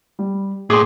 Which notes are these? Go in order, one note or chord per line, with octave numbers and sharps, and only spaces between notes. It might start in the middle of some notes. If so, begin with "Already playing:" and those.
G3
A2 G#4 C6 D6